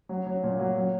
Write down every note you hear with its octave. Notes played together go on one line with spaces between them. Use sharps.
F#3
F#3
A#2
F#3
F#3